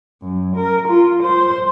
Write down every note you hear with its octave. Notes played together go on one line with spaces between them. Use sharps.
F#2
A#4
F4
C5